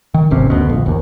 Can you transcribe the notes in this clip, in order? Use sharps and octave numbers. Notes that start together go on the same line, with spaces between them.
D#3
D#1 G#1 C3 C#4
F#1 D2 B2
A#1
F#1 D#2